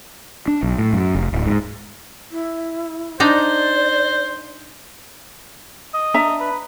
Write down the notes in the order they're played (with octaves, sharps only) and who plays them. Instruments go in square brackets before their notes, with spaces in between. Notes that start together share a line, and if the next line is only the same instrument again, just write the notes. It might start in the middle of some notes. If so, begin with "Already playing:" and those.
[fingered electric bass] D4
B1
A2
F#2
F1
D1
G#2
[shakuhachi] E4
[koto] D4 D#4 A#5 [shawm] C5 [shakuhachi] D5
[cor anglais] D#5
[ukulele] D4 E5 A#5
[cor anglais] B4